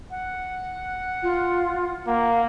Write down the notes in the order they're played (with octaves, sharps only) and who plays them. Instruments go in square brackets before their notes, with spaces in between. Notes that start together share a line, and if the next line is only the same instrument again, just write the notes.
[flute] F#5
[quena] F4
[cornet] A#3 [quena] F#5